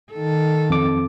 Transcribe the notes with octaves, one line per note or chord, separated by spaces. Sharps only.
D#3 A4
F2 D6